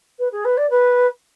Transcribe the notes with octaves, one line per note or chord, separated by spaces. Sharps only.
B4
G#4
B4
D5
B4